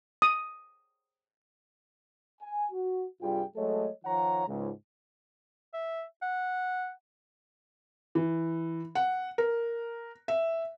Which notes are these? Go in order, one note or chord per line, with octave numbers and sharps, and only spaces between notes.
D#6
G#5
F#4
G2 C3 G3 F4 G#4 G5
F#3 G#3 A3 A4 C#5 D#5
D#3 F3 C#5 F#5 A#5
C#2 G#2
E5
F#5
E3
F#5
A#4
E5